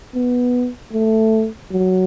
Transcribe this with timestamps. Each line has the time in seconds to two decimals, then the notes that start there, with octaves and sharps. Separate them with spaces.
0.14 B3
0.93 A3
1.71 F#3